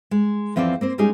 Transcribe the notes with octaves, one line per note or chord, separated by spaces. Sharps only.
G#3
E2 F3 C4 A4 C5 D5
A#3 C4 C5
G3 G#3 C#4 D#4 G4 G#4